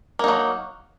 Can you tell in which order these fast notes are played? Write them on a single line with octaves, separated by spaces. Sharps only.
A#3 D#4 F#3